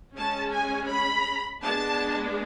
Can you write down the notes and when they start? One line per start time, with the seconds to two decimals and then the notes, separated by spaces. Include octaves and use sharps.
0.15 G#3 C#4 A5
0.52 G#5
0.89 B5
1.62 G#3 B3 D4 A5